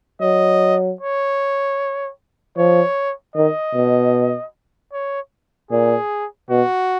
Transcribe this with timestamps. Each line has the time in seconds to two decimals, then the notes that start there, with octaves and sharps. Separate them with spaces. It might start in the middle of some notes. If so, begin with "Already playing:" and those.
0.21 F#3 D#5
1.01 C#5
2.57 F3 C#5
3.36 D#3 D#5
3.75 B2
4.93 C#5
5.71 A#2 G#4
6.50 B2 F#4